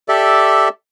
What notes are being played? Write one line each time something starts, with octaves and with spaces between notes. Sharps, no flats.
G4 A4 D5 E5